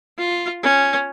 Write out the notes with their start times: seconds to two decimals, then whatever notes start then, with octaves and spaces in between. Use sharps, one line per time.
0.19 F4
0.63 C#4